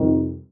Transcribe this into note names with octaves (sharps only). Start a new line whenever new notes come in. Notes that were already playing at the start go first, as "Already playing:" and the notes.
Already playing: F2 C3 D#3 G3